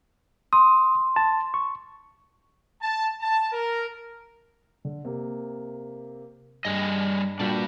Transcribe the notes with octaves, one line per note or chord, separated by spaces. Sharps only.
C6 D#6
A5
C#6
A5
A5
A#4
D3
C3 A#3
G2 G3 G#4 D#5
A#2 G3 D4 F#4